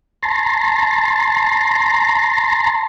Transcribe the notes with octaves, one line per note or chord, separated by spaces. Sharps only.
A5 A#5 C6